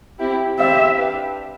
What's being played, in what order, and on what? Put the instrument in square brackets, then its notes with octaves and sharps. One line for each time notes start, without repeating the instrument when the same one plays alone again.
[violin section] C4 E4 G4
[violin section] C4 E4 G4 C5 F5 [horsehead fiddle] E5
[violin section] D4 G4 B4 F5